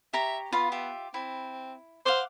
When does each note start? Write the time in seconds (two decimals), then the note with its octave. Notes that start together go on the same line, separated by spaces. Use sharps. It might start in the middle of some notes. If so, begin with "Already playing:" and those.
0.13 G4 C#5 E5 A#5
0.53 B3 F4 F5 B5
0.72 F4 G4 E5
1.14 C4 E4
2.06 C5 F5 F#5 D6